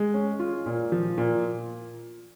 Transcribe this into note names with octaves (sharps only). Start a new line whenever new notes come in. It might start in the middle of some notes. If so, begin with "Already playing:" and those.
Already playing: G#3
C#4
F4
A#2
F3
A#2